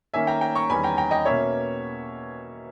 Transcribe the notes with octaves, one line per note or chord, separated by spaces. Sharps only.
D#3 A#3 C#4 E5 G#5
G5 A#5
G5 A#5
A#5 C#6
E2 D#3 G3 C#4 G#5 B5
G5 A#5
G5 A#5
D#5 G5
B2 A#3 C#4 C#5 E5